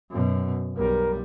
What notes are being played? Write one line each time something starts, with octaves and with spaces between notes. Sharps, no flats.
F#2 B2
B1 G3 A#4